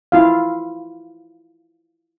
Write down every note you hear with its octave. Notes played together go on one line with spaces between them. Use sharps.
E4 F4 F5